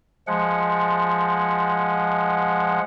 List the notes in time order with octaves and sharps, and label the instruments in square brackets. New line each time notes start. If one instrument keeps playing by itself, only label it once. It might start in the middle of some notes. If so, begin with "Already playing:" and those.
[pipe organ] F3 G#3 F#5